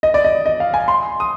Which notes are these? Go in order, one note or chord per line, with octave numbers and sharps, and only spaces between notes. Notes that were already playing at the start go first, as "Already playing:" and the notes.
D#5
D5
D#5
D#5
F5
G#5
C6
D#6